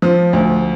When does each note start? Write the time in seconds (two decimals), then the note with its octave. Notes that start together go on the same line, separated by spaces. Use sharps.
0.02 F3
0.33 D2